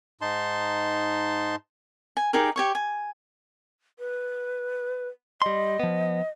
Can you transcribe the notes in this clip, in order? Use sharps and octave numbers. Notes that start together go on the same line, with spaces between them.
G#2 D#4 A5 C6
G#5
D#4 G4 G#4 A#4
G4 C#5 C#6
G#5
B4
G3 D#5 C6
F3 B3